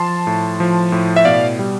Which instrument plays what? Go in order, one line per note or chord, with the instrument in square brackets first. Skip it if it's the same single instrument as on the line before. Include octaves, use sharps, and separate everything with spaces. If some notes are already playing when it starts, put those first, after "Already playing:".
Already playing: [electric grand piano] F3 A5 C6
A2
F3
A2
E5
B2 D5 F5
G3